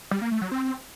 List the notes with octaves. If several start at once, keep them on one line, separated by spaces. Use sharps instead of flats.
G3
A#3
A3
F#3
C4